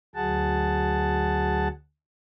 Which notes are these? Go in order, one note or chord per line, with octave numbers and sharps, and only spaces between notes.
D2 F#3 G#4 F#5 A5